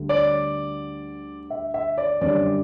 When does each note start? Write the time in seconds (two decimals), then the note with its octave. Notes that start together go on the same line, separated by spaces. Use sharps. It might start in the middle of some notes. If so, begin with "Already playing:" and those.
Already playing: D2 D3 G3
0.09 D5
1.50 E5
1.74 E5
1.98 D5
2.21 F#2 D3 G3 D5